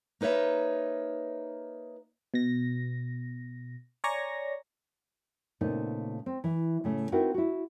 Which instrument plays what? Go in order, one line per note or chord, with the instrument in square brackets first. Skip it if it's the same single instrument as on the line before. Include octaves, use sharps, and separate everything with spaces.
[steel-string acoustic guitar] A#3 D#4 B4 C#5 E5
[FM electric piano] B2 A#6
C#5 D5 G#5 A#5 C#6 A#6
[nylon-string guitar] A#2 C#3 A3 B3 C4 D#4
C4
E3
A2 C#3 A3
C4 D#4 E4 F#4 A#4 B4
E4 F#4